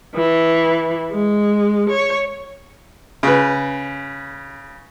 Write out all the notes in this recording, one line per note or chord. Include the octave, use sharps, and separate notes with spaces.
E3
G#3
C#5
C#3 B4